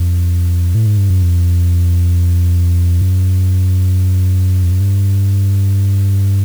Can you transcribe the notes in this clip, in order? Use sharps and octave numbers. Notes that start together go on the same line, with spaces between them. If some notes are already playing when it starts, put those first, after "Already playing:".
Already playing: F2
A2
G#2
G2
F#2
F2
F#2
F2
F#2
G2